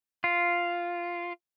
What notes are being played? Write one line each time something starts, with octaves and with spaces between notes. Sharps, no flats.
F4